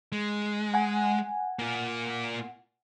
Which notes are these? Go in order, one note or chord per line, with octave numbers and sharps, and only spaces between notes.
G#3
F#5 G#5
A#3 F4